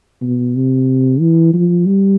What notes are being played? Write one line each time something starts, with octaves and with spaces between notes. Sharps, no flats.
B2
C3
E3
F3
G3